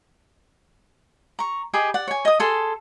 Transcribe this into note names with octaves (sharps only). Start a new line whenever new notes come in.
A#5 C#6
G4 G#4 D#5 B5
D5 F#5
C#5 G#5
D#5 D#6
G#4 A4 C6